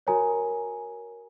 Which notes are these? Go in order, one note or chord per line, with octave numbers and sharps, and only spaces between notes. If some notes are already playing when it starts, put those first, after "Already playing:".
F#4 A#4 C#5 G#5 A#5